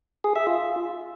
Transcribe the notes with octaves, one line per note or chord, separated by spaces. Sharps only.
G#4
E5
F4